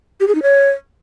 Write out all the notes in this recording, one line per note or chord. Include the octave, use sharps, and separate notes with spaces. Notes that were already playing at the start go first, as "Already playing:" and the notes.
G4
G#4
D#4
C#5